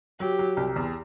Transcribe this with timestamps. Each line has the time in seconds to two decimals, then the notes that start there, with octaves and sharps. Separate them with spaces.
0.19 F#3 G4
0.39 F#3
0.57 C2
0.76 E2